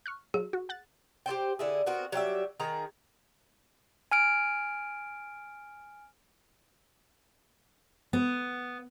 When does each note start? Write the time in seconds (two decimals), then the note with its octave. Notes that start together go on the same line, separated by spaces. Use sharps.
0.06 C#6 F6 F#6
0.34 F#3 G#4
0.53 F#4
0.69 F#5 F#6 A6
1.26 G4 A4 C5 G5
1.59 D3 E4 G#4
1.86 B3 C4 F#4 A#4
2.12 F#3 G3 G4 E5
2.60 D#3 G#4 A#5
4.11 G#5 F6 D7
8.13 B3